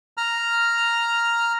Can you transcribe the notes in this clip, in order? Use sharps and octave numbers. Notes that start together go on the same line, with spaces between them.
A#5 F6